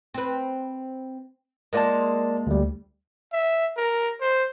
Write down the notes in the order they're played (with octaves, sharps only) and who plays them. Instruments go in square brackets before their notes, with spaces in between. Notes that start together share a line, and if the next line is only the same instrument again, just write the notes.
[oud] C4 B4
[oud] G#3 A#3 F4 [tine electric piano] A#4 D5 A5
[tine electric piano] D2 G3
[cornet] E5
A#4
C5